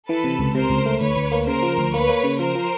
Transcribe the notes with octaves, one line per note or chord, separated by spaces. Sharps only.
E3 A4 B4
C3
C#2
C3 A#4 C5
C#2
A3
D2 B4 C#5
D2
A#3
C#3 A#4 C5
F3
D2
A#3 B4 C#5
A#3
C#3
F3 A#4 C5
F3